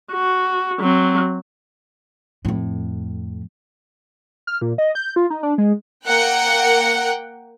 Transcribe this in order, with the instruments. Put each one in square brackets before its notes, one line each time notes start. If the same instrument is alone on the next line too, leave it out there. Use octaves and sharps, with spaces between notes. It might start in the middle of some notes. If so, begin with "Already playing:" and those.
[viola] F#4
F#3 C4
[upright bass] F2 A2
[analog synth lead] F6
A#2
D#5
G6
F4
D#4
D4
G#3
[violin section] A#3 A#4 F#5 G5 F#6 C#7